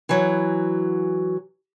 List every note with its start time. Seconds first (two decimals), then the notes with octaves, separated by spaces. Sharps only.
0.09 E3 F#3